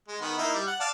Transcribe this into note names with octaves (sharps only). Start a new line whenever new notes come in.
G#3
D#3 B3
A#3 D#4 E4
G3
F#5
D5 F5 A5